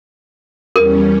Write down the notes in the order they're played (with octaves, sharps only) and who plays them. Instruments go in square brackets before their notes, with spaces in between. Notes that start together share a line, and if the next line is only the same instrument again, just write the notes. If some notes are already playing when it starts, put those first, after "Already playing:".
[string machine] E2 G3 C#4 [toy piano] A#4